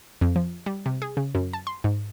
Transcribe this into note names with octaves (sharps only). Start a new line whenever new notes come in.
F2
F3
G3
C3
G#4
C#3
F#2
A5
C6
G#2